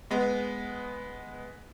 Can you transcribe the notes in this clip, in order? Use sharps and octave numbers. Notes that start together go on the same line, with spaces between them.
G#3 B3